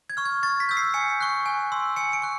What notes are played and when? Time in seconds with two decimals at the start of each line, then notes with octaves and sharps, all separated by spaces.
0.10 G#6
0.17 C#6 F6
0.25 G#6
0.43 C#6 A6
0.60 B6
0.69 E6 G6
0.77 C7
0.94 G#5 C#7
1.21 C#6 F#6
1.46 G#5
1.72 C6 E6
1.96 G#5 C#7
2.13 D7
2.22 C#6 F#6